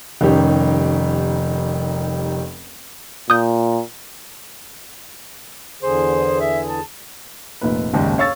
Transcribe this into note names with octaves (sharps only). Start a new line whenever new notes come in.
F1 D#3 G3 C#4 G4
A#2 D#6 G6
E2 D3 G#4 C5
E5
A5
F1 A#2 B4
F#1 D#2 G#2 D4
C#5 F5 C#6 E6 A6